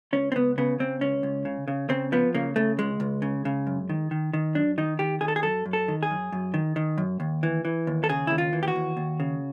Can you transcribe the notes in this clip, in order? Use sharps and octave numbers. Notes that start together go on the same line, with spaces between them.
C#2 C#4
C4
C#2 B3
C#3 B3
C#3 C4
C#2 C#4
C#2
C#3
C#3
C#3 C4
F3 B3
C#3 A#3
C#3 A3
C#2 G#3
C#2
C#3
C#3
F#2
D#3
D#3
D#3
F#2 D4
D#3 D#4
D#3 G4
D#3 G#4
A4
G#4
F#2 A4
F#2
A4
D#3
G#4
F#2
F#2
D#3
D#3
F#2
D#2
E3
E3
D#2
A4
C#3 G#4
D#2 E4
F4
E3
G4
F#4
D#2
D#2
C#3